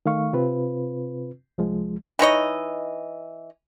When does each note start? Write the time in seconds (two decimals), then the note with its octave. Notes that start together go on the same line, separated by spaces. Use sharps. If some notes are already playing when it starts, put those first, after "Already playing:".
0.06 D#3 A3 F5 C#6
0.33 C3 C4 F4 B4
1.58 C2 F3 G#3
2.19 E3 D#4 C#5 D#5